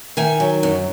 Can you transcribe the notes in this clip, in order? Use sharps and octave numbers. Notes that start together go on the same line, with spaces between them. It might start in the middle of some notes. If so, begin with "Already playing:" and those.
D#3 E5 G#5
F#3
F#2